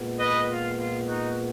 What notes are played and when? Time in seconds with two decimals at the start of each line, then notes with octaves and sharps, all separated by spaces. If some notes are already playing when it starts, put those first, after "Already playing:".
Already playing: A#2 G#3 B3
0.19 B4 D#5
0.49 F4
0.78 F4
1.08 D#4 F#4